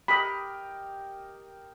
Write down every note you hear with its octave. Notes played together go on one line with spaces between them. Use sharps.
G4 A#4 D#5 B5